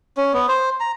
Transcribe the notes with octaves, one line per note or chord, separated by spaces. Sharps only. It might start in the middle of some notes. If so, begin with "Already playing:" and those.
C#4
B3
C5
A#5